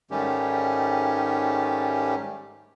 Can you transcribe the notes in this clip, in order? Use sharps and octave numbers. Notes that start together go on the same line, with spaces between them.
G#2 D#3 G3 A3 C#4 G4